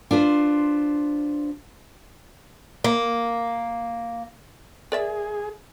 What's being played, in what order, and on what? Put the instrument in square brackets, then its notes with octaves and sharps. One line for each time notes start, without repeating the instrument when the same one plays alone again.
[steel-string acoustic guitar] D4 F4 B4 C5
[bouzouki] A#3
[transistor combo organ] G#4 [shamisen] A#4 D5 E5